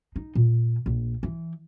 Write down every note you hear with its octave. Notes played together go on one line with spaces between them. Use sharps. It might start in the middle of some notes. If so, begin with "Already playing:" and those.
D#4
A#2
A#1
E3